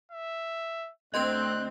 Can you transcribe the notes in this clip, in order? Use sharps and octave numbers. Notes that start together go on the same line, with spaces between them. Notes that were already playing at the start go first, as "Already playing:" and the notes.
E5
D2 C4 D#5 C6 F#6 G6